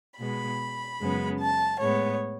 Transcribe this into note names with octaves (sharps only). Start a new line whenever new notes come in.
B2 G#3 B3 B5
F#2 C#3 G#3 B3
A5
A2 G#3 B3 C#5